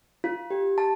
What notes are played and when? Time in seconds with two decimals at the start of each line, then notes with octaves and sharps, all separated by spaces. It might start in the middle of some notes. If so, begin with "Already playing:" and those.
0.24 F4
0.50 G4
0.78 A5